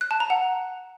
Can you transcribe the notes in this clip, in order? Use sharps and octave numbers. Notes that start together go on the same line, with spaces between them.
F#6
A5
A#5
F#5